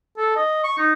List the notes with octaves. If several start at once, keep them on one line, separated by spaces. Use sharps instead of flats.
A4
D#5
C#6
D#4